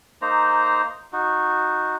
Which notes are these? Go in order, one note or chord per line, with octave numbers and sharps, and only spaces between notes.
A#3 D#4 C5 A#5
D#4 F#4